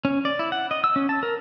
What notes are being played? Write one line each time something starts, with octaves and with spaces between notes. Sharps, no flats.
C#4
D5
E4
F#5
D#5
E6
C#4
A5
A#4